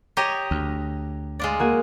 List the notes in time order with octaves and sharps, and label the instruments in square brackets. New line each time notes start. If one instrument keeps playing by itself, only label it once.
[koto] G4 C#5 D#5 [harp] A#5
[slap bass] D2
[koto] G#3 F4 D5
[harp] A#3 F#4 G#4